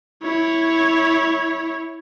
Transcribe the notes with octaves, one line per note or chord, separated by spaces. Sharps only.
E4 C#5